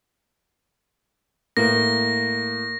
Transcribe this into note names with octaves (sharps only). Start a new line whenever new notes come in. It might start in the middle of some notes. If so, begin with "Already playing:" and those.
A2 A#3 A#6